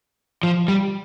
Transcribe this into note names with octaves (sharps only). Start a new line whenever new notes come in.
F3
G3